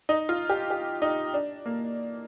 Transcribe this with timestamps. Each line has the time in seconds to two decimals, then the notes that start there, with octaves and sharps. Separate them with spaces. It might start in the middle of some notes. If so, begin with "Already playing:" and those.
0.09 D#4
0.29 F4
0.49 G4
0.70 G4
1.02 D#4
1.34 D4
1.66 A#3